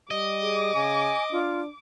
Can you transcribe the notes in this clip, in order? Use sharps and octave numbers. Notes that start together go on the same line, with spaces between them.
G3 D#5 D6
G#4
C#3 G#5
D4 F4